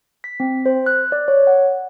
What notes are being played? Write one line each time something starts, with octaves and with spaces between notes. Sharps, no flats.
B6
C4
C5
F#6
D5
C#5
F#5